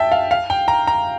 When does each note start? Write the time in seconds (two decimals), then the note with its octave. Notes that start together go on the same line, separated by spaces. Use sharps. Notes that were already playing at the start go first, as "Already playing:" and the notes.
Already playing: E5 G5 A5
0.12 F5
0.31 F5
0.50 G5
0.68 A#5
0.87 A#5